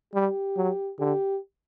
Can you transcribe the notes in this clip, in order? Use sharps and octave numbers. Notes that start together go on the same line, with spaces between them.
G3 G4
F#3
D3 G4